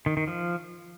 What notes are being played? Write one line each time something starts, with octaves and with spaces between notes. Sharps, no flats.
D#3
D#3
F3